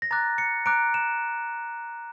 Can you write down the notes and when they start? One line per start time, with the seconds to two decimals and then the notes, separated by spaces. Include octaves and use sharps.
0.02 A#6
0.11 A#5 D6 F#6 A6
0.38 C#7
0.66 A#5 D6 F#6 D7
0.94 E7